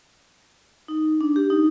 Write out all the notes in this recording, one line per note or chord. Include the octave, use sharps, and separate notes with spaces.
D#4
D4
G4
D#4